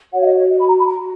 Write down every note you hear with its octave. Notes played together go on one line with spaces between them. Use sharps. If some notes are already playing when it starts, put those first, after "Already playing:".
F#4 C#5 F#5
F5
D#5
C#5
D#5
B5
A#5
B5
A#5